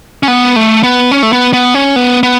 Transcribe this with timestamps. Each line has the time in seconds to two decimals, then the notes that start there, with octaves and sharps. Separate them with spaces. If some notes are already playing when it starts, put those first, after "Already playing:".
0.23 C#4
0.28 B3
0.56 A3
0.83 B3
1.11 C#4
1.23 A3
1.33 B3
1.53 B3
1.74 C#4
1.96 B3
2.23 B3